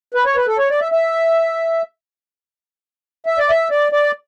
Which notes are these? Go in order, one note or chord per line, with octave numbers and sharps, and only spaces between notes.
B4
C#5
B4
A4
C#5
D5
E5
E5
E5
D5
E5
D5
D5